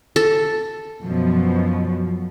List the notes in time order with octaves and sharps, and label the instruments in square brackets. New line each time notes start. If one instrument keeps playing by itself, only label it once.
[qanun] A4
[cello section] F#2 B2 F3